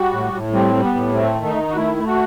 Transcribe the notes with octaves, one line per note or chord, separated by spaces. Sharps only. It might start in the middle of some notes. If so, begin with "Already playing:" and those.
Already playing: G3 F#4
A2
A2
G3 C4
G3
B3
A2
A3 C4
D#3
D#4
D#3
F#4
A3 E4
A3
F#4